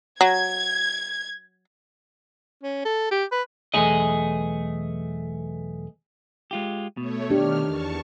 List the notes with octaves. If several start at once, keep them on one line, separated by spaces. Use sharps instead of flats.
F#3 G#6
C#4
A4
G4
B4
B1 E2 A3 G#4 D#5
G#3 F4 G4
B2 A3 C#5
D#3 D4 G4 F6
E2 A5 C#6